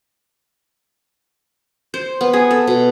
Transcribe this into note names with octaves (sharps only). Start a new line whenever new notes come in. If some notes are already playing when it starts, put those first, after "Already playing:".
C5
B3
G#4
A4
B2